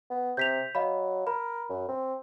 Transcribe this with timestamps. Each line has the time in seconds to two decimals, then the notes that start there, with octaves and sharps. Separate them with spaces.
0.10 B3
0.37 C3 G6 B6 F7
0.75 F#3 D#5 F5 B5
1.27 A#4 B5
1.69 F#2
1.88 C4